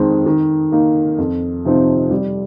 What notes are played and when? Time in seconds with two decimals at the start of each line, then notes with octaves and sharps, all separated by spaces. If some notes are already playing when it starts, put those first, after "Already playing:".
Already playing: F2 D#3 G#3 C4
0.26 D#3
0.72 A#3 D#4
1.19 F2
1.65 C3 F3 C4 D#4
2.11 G3